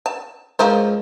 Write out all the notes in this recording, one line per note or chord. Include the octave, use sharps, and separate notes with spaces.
A5
C#2 F3 A#4 C5